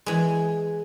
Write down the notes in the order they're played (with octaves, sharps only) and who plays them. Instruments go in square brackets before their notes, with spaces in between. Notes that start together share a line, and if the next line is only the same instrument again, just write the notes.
[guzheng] E3 G#3